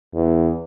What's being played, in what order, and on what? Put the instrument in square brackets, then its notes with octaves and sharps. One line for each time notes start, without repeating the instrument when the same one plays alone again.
[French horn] E2